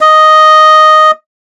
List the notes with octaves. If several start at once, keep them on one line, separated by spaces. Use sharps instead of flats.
D#5